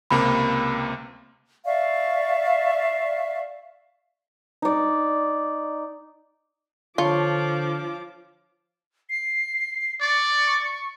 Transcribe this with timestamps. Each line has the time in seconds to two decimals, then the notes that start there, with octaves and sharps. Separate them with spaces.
0.11 C#2 C3 A#3 B5
1.65 D5 E5 F5 C#6
4.62 D#4 D5
6.98 D3 F3 F4 C#5 A5 C#6 D6
9.10 C7
10.01 D5 C#6